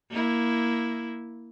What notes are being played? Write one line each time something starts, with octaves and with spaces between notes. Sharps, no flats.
A#3 E4